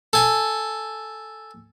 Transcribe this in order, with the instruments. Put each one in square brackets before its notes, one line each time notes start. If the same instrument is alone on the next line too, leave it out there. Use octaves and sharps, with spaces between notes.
[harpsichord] A4 G#5